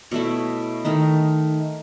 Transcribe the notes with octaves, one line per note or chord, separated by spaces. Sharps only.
B2 A3 E4 C#5
D#3 A3 D#4